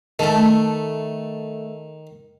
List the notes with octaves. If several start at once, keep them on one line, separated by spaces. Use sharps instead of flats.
D#3 A3 A4